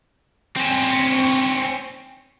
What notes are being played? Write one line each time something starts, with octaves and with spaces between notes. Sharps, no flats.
C4 C#4